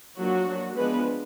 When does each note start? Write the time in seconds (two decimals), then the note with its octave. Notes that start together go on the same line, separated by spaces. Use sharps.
0.18 F3 F#3 A#3 D4 F#4
0.47 F#3 A#3 D4
0.77 F3 G#3 B3 D4 B4